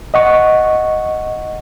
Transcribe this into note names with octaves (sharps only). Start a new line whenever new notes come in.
D#5 F#5 C#6